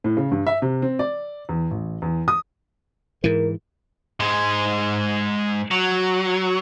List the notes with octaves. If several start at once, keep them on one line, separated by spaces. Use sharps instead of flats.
A2
C#3
G2
E5
C3
C4
D5
E2
A1
E2
D#6
G#2 E3 A#4
G#2 G#3
F#3